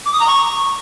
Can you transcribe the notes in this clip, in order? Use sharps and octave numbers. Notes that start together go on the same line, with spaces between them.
D6
D#6
A#5
C#6